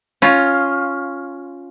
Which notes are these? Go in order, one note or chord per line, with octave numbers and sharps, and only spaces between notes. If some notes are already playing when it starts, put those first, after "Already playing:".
C#4 F4